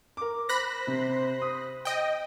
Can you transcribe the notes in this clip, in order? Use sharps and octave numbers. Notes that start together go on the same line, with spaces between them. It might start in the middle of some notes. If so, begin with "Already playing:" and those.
A#4 D6
C5 B5 F#6 A#6
C3
D#6
D#5 G5